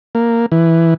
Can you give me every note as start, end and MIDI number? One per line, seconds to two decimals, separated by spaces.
0.15 0.46 58
0.52 0.94 52